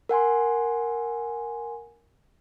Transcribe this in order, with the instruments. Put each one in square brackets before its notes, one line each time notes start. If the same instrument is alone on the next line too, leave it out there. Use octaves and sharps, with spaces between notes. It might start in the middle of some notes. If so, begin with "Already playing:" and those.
[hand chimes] A#4 F#5 G#5 C6